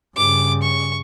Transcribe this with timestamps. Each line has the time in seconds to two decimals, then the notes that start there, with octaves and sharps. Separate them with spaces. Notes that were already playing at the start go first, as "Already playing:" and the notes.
0.17 G2 C#3 D6
0.62 C#6